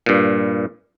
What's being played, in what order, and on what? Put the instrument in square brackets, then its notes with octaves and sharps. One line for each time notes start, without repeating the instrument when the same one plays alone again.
[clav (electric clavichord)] G2 A#2